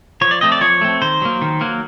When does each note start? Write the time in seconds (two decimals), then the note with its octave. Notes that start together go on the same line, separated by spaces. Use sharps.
0.21 F3 C#5
0.31 D5
0.41 A3 C4 D#5
0.52 D5
0.61 F3 C#5
0.81 A3 C4
1.02 D#3 C5
1.22 F#3 A#3
1.42 D#3
1.61 F#3 A#3